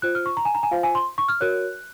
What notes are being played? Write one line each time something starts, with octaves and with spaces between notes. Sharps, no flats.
F4 C5 F#6
F6
C#6
A#5
G#5
A#5
G#5
F4 C5 F5
G#5
C6
C#6
F6
F#4 A#4 C#5 F#6